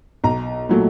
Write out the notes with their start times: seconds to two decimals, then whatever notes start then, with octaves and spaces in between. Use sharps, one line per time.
0.24 B1 A#5
0.69 A#2 F#3 A3